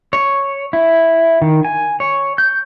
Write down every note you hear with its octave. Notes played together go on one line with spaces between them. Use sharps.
C#5
E4
D#3
G#5
C#5
G6